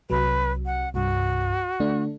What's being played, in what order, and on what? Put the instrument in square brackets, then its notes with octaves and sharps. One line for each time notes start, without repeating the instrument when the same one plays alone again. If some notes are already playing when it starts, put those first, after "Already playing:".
[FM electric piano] C2 C3 F#3 [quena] B4
[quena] F#5
[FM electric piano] C2 G2 [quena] F#4
[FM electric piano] D3 A3 D4